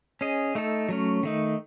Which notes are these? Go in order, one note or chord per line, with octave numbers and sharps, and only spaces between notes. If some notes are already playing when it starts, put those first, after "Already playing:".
C#4 G#4 D#5
A3 D#4 A4
F#3 A3 C#4
D#3 A3 D#4